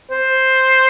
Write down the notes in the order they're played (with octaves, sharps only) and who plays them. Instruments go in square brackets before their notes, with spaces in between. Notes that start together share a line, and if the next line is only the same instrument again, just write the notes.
[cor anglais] C5